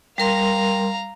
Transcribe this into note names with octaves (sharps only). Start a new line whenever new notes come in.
G3 A#4 F5 A#5 C6